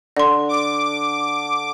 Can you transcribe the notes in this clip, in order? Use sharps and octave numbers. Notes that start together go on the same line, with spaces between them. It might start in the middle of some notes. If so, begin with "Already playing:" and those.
D3 D5 C6
D6